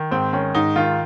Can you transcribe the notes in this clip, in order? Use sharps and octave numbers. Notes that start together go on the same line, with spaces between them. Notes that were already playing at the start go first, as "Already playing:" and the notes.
Already playing: D#3
G#2 C4
D#3 C#4
G#2 D#4
D#3 F4